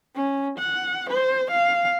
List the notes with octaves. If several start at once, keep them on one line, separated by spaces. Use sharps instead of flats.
C#4
F#5
C5
F5